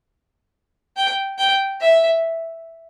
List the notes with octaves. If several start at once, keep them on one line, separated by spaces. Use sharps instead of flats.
G5
G5
E5